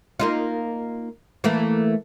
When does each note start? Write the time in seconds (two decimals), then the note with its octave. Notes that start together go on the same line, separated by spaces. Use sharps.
0.20 A#3 D#4 F4
1.44 E3 A3 A#3